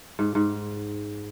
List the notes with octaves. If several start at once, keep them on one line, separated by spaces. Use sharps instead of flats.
G#2
G#2